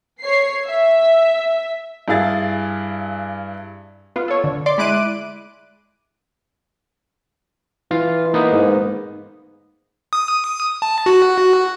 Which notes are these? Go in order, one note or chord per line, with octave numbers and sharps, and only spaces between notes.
C#5 C7
E5
G2 E4 G#4 F5 A6
B3 F4
A4 C#5
D3
D5 C6 D6
G#3 E4 D6 F#6 D7 D#7
E3 F4
A#3 B3 D#4
G#2
D#6
A5
F#4